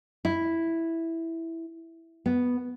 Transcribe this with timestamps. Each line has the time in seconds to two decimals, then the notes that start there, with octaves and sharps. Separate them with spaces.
0.25 E4
2.26 B3